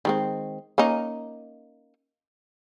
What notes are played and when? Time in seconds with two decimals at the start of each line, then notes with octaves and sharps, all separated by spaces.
0.05 D#3 G#3 C4
0.78 A#3 C#4 D#4